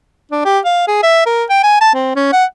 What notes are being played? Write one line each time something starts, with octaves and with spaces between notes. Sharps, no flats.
D4
G4
F5
G#4
E5
A#4
G5
G#5
A5
C4
C#4
F#5